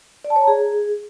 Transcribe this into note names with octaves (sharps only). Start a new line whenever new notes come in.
D5
A5
C#5
A#5
G#4